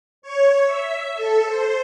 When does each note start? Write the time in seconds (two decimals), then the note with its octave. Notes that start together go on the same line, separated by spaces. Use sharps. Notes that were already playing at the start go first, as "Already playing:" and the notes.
0.22 C#5
0.66 E5
1.14 A4
1.47 C5